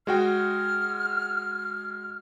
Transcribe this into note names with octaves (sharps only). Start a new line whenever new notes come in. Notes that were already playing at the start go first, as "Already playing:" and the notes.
G#3 F#4 G5 F6